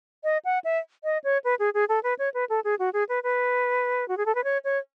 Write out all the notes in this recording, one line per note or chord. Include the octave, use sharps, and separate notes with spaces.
D#5
F#5
E5
D#5
C#5
B4
G#4
G#4
A4
B4
C#5
B4
A4
G#4
F#4
G#4
B4
B4
F#4
G#4
A4
B4
C#5
C#5